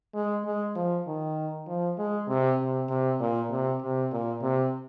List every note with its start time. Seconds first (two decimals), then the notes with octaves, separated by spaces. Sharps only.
0.15 G#3
0.45 G#3
0.76 F3
1.07 D#3
1.67 F3
1.98 G#3
2.28 C3
2.59 C3
2.89 C3
3.20 A#2
3.51 C3
3.82 C3
4.12 A#2
4.42 C3